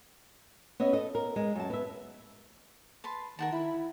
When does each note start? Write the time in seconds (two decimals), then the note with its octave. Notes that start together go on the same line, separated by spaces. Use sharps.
0.80 B3 C#4 D#5 E5
0.93 A4 D#5
1.15 A#4
1.36 G#3
1.56 F#2 A5
1.70 B3 E5
3.04 B4 A5 C6
3.39 D#3 A#4 F#5 A5
3.52 E4 B5